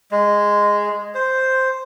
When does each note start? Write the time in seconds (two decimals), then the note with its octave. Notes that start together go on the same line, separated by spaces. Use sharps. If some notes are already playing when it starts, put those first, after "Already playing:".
0.12 G#3
1.14 C5